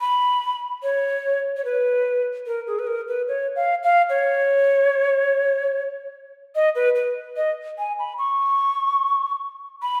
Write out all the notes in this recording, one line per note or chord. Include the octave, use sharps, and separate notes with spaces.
B5
C#5
C#5
B4
A#4
G#4
B4
A#4
B4
C#5
F5
F5
C#5
D#5
B4
B4
D#5
G#5
B5
C#6
B5